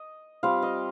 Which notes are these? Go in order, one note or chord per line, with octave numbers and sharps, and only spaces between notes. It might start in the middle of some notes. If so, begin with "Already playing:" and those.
Already playing: D#5
G3 C4 F4 F5
D#5